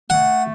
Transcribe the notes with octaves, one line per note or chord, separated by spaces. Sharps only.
A3 F#5